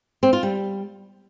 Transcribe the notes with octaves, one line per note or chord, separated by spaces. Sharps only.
C4
F4
G3